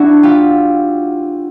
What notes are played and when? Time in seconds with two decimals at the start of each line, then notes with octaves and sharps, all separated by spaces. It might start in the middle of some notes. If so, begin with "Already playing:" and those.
Already playing: D4 E4 F#4
0.23 F4 G4